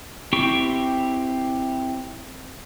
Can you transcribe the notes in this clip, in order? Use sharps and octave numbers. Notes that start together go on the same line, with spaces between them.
C4 E4 G4 G5 C#6